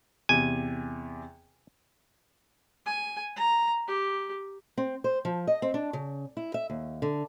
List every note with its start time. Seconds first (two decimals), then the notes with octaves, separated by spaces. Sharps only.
0.29 E2 C3 G#5
2.86 G#5
3.36 A#5
3.87 G4
4.77 C4
5.04 C5
5.25 F3
5.47 D#5
5.62 C4
5.74 D4
5.93 C#3
6.37 E4
6.54 E5
6.70 D#2
7.02 D3